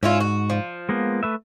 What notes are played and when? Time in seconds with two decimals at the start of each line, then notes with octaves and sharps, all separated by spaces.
0.03 G#2 C#4 E4 F4
0.20 F#4
0.50 F3
0.89 G#3 A#3 B3
1.23 A3 B4 E5